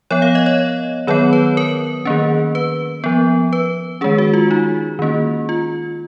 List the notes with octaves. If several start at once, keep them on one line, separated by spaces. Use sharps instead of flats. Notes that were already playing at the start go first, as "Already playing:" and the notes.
F3 B3 C#5
F5
D#5
C#5
D#3 F#3 B3 C#5
B4
A#4
D#3 A#3 C#4
B4
F3 B3
B4
D#3 G#3 C#4 G#4
F#4
F4
D#4
D#3 A#3 C#4
F4